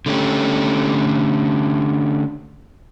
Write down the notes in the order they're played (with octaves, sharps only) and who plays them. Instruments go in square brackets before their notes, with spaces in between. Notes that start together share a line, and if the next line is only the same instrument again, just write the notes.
[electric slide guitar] D3 A3 C#4 G4